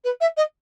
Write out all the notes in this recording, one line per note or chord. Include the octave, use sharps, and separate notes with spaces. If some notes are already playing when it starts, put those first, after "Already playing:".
B4
E5
D#5